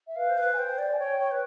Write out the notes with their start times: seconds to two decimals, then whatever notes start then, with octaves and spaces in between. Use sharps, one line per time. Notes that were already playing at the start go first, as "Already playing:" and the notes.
0.07 E5
0.16 B4 F5
0.29 C5
0.37 B4
0.53 G#5
0.58 C5 G5
0.78 D5
0.92 G#5
0.99 C#5 G5
1.19 C#5
1.31 B4